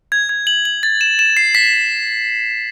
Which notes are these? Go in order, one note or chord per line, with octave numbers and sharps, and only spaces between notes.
G#6
G#6
F#7
F#7
A6
E7
E7
C7
B6